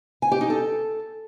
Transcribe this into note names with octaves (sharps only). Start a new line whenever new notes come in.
G#5
G4
D#4
A4